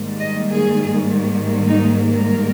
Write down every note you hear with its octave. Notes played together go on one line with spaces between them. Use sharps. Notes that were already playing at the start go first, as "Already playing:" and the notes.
Already playing: G#2 D#3 G3 A#3
D#5
G#4
D#4
A#4